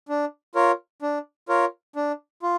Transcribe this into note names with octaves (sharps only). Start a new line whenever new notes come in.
D4
F4 A#4 C#5
D4
F4 A#4 C#5
D4
F4